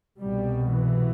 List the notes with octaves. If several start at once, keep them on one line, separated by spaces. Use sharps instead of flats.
C2 B2 G3
E3